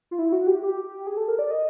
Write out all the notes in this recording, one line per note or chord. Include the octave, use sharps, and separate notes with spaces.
F4
E4
F#4
G4
G4
G#4
A4
A#4
D5
D#5